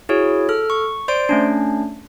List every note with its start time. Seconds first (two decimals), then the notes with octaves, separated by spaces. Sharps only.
0.09 E4 F#4 G#4 C#5
0.49 A4 F6
0.70 C#6
1.08 C5 D5 C6 D7
1.29 A3 C#4 D4